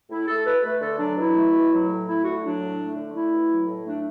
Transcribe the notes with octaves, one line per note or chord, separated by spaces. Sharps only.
A2 E4
A3 A4
B2 B4
A3 B4
D3 A4
F#3 D4
B2 E4
A3
B2
F#3
A2
A3 E4
D3 F#4
F#3 D4
A2
A3
D3
A3 E4
B2
F#3
A2
A3 D4